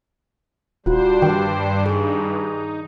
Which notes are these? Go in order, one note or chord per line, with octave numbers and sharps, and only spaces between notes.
D#1 G3 D4 F4 F#4 C5
G2 D#3 G5
D#4 G#4